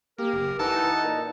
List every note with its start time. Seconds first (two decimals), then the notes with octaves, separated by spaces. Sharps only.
0.18 A#3 G4 A#4
0.33 F#1
0.59 E3 D#4 A4 F#5 A5 E6
1.03 A#2